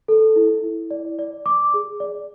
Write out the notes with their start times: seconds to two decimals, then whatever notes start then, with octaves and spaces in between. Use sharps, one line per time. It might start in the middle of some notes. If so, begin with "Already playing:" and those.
0.08 A4
0.36 E4
0.64 E4
0.91 D5
1.19 D5
1.46 D6
1.74 G#4
2.00 D5